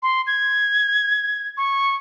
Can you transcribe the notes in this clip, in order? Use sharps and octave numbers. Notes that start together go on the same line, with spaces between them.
C6
G#6
C#6